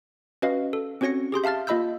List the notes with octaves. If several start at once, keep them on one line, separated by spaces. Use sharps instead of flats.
C#4 F#4 B4 D#5 F5
A4
C4 C#4 F#4 C#5 A#6 C#7
G4 G#4 C6 G6
E5 F5 A5 F6 A6
A#3 F4 D#5 B5 E6 G6